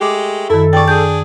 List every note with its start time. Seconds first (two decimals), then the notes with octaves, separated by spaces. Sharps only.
0.01 G#3 A3 G4 D6
0.50 F#2 D#3 E4 A4
0.73 E2 D5 G5 C#6
0.88 D4 G#4 G6